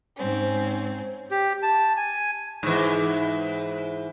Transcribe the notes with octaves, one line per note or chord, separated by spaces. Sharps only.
G#2 C4 C#4
G4
A5
G#5
G#2 E3